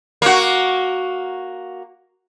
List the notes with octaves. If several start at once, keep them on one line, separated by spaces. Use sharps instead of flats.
A#3 F#4